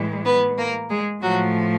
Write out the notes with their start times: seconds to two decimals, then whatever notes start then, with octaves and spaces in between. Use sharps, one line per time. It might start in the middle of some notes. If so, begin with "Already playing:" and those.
Already playing: A2 E3 G#3
0.25 B3 B4
0.57 A#3 A#4
0.90 G#3 G#4
1.22 A2 F3 F#3 A3 F#4